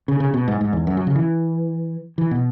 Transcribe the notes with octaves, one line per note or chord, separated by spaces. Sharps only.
C#3
C#3
B2
G#2
G#2
E2
F#2
F#3
C#3
E3
E3
B2